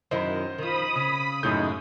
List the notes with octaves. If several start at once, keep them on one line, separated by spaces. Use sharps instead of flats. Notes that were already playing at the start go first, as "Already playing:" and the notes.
F#2 D#3 E4 C5 D#5
D#3 F3 B5 D#6
C#3
F#2 A2 C#3 G#3 D#4 G6